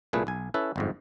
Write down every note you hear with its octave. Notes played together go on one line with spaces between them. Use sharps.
C2 A#2 A3 G#4 B4
B1 G#5
C#4 E4 A4 B4
G1 F2 G#2